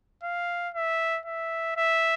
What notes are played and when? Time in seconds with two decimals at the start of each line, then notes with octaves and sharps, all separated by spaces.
0.23 F5
0.74 E5
1.26 E5
1.76 E5